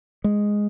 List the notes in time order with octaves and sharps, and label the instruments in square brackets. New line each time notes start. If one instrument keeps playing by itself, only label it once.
[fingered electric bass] G#3